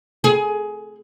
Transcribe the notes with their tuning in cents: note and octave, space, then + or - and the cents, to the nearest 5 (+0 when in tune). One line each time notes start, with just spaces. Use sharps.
G#4 +15